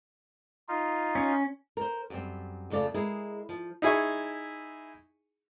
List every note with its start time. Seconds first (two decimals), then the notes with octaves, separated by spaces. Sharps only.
0.68 D#4 F4
1.15 C#4
1.77 A#4 C5
2.10 F#2 G3 C4
2.70 F2 C#3 A3 D5 F5
2.94 G#3 E4 G#4 A#4
3.49 F3
3.82 D#4 E4 G#4 G#5 C#6